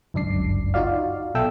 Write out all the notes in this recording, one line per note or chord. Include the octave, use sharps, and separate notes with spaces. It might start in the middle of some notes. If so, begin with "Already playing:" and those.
G1 C#2 F#2 D4 D5 C7
D#4 F4 F#4 D5 F5
B1 B2 A4 E5 G5 E6